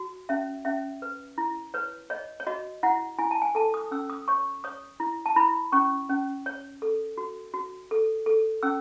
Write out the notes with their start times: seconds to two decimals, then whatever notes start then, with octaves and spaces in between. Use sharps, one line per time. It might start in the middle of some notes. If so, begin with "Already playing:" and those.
Already playing: F#4
0.29 C#4 E5
0.65 C#4 E5
1.02 B4
1.38 E4
1.74 B4 C#5
2.10 C#5 D#5
2.40 C#5
2.47 F#4 D#5
2.83 E4 F#5
3.18 E4 G#5
3.31 A5
3.42 G#5
3.55 A4 A5
3.74 D#6
3.91 C#4 E6
4.10 D#6
4.28 C#5 C#6
4.64 C#5 D#6
5.00 E4
5.26 A5
5.36 E4 B5
5.72 C#4 C#6
6.09 C#4
6.46 C#5
6.82 A4
7.18 F#4
7.54 F#4
7.91 A4
8.26 A4
8.63 C#4 E6